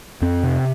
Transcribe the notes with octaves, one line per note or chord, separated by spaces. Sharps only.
F2 C4
C3